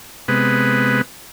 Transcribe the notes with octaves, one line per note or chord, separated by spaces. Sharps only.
C3 G#3 B3 B4